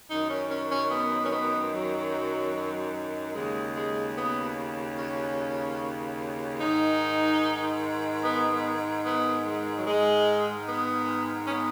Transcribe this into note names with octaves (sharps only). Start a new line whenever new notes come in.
F#2 D#3 D#4
C#4
C#4
C#4
B3
C#4
B3
F#3
D#2 C#3 G#3
G#3
B3
C#4
G#2 D#3 D#4
B3
B3
B3
G#3
F#3
G#2 D#3 G#3
B3
C#4
B3